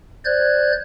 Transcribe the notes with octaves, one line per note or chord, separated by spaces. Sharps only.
C5 D5 F#6 G#6